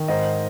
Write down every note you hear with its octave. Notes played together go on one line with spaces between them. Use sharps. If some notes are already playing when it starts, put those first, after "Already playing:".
Already playing: D#3
G#2 C5 D#5